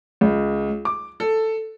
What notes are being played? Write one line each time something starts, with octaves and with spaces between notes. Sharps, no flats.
C#2
D6
A4